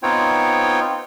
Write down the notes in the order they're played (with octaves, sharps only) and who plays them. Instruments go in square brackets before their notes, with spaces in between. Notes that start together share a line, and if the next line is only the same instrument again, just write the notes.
[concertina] B3 C4 D#4 F4 C#5 G5